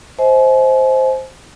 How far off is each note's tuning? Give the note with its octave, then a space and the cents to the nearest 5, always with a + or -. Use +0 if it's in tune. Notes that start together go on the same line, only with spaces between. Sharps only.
C5 +0 D#5 +40 G#5 +40